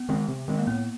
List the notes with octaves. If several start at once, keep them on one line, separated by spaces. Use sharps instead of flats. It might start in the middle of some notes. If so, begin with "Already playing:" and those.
Already playing: B3
D#3 G#3 C4
C3
D#3 G#3 C4
A#3
A2 B3